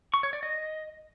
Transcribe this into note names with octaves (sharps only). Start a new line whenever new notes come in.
C#6
C#5
D5
D#5